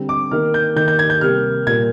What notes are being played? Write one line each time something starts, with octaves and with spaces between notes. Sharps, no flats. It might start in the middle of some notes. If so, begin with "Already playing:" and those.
Already playing: D3 G3 C4
D6
D#3 A#3 F6
G6
D#3 A#3 G6
G6
G#6
G6
C3 G3 A#3 F6
A#2 G3 A#3 G#6